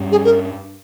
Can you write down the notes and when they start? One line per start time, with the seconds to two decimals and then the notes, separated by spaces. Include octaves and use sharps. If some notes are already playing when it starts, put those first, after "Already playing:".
Already playing: G2 G3 C#4
0.12 G#4
0.25 A#4